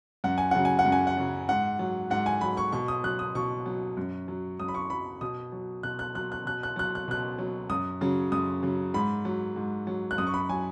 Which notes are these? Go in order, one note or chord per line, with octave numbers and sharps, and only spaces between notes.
F#2 F#5
G#5
C#3 F#3 F#5
G#5
F#5
F#2
G#5
F#5
C#3 F#3
G#2 F#5
F#3
G#2 F#5
G#5
F#3 B5
C#6
B2 C#6
D#6
F#3 F#6
D#6
B2 C#6
F#3
F#2
F#3
F#2 D#6
B5
C#6
F#3 B5
B2 D#6
F#3
B2 F#6
F#6
F#3 F#6
F#6
B2 F#6
F#6
F#3 F#6
F#6
B2 F#6
F#3
F#2 D#6
C#3 F#3
F#2 D#6
C#3 F#3
G#2 B5
F#3
G#2
F#3
F#6
F#2 D#6
C#6
B5
F#3 G#5